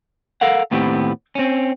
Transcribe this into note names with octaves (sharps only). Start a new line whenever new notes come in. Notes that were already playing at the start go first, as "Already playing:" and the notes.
A4 A#4 F5 F#5
D#2 A2 B3 C4 G4
C4 C#4